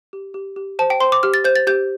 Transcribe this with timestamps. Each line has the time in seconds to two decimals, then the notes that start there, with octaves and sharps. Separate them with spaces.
0.13 G4
0.34 G4
0.56 G4
0.79 C5 A5
0.90 G5
1.00 C5 C6
1.12 D6
1.23 G4 F6
1.34 A6
1.44 C5 G6
1.56 A6
1.67 G4 G6